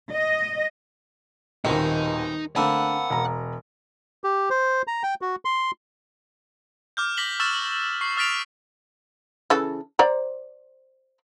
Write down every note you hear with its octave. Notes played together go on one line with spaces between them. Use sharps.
D#5
D#1 D#2 B2 D#3 C4 D#4
D3 A3 A#3 C4 F#5 A5 B5 E6
E1 A#5
G4
C5
A#5
G5
F#4
C6
D6 F6 G6
D6 A#6 B6 F#7 G7
C#6 E6 F6 A6 E7
C#6 C7
D#6 F6 A6 B6 D7 F7
C#3 E3 A4
C5 D5 A#5